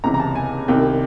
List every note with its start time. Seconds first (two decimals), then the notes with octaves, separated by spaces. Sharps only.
0.04 C#2 C3 E3 A#5
0.14 A#5
0.20 A5
0.35 G#5
0.68 C2 C3 D#3 G5